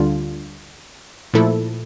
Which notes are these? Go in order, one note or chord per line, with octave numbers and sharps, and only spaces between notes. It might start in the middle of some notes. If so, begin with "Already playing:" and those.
Already playing: D2 D3 G3 D4 F4
A#2 F3 A3 E4 A4